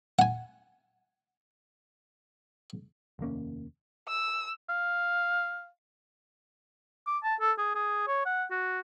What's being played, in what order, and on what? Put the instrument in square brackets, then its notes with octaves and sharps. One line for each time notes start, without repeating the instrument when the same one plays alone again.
[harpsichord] F#5 G#5
[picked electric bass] F1 D#2 A#3 C#4
[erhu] E6
[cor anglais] F5
[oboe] D6
A5
A4
G#4
G#4
C#5
F#5
F#4